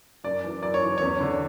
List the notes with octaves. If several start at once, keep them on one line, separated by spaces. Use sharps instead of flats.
F#2 D5
E3
F#2 D5
C#5
E3
E2 C#5
D3